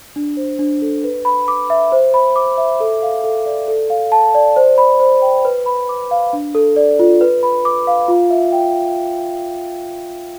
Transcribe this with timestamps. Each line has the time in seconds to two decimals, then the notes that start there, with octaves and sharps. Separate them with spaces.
0.16 D4
0.37 C5
0.59 D4
0.82 A4
1.04 B4
1.25 B5
1.48 D6
1.70 E5
1.92 C5
2.14 B5
2.36 D6
2.58 E5
2.80 A4
3.02 F5
3.24 A4
3.46 D5
3.68 A4
3.90 F5
4.12 A5
4.35 D5
4.56 C5
4.78 B5
5.00 C5
5.22 G5
5.45 B4
5.66 B5
5.89 D6
6.11 F5
6.33 D4
6.55 A4
6.76 D5
6.99 F4
7.21 B4
7.43 B5
7.65 D6
7.87 F5
8.08 F4
8.30 E5
8.52 G5